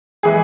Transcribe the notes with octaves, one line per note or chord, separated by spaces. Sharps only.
E3 G#3 G#4